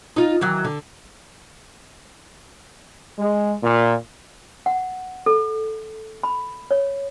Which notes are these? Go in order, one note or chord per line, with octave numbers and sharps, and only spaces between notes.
D#4 F4
D#3 E3 F#3
D3
G#3
A#2
F#5
A4
B5
C#5